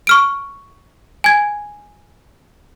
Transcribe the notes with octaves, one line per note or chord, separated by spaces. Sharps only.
C#6 F6 D7
G#5 G#6